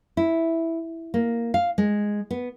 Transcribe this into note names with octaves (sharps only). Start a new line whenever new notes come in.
E4
A#3
F5
G#3
B3